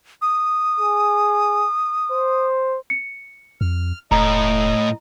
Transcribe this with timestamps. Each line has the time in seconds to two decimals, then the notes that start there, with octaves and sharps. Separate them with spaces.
0.22 D#6
0.80 G#4
2.11 C5
2.90 C#7
3.61 F2 F6
4.11 E1 A2 D#5 A#5